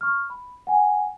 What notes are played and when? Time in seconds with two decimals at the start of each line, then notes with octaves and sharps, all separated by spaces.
0.01 C#6 F6
0.30 B5
0.67 F#5 G#5